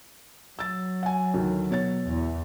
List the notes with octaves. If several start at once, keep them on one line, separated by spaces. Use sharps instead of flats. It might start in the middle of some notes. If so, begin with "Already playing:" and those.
F#3 E6 A6
F#5 G#5
D2 D#3
B2 C#5 A6
E2 E3